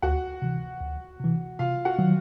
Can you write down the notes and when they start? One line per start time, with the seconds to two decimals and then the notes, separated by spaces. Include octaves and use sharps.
0.02 D2 F#4 F#5
0.42 C3 E3
0.81 D2
1.20 C3 E3
1.59 C3 F4 F5
1.85 F#4 F#5
1.99 D#3 F#3